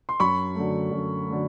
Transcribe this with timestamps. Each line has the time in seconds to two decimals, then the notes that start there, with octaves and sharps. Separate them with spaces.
0.09 C6
0.20 F#2 B5 C#6
0.55 D3 F#3 A3
0.91 F#2
1.28 D3 F#3 A3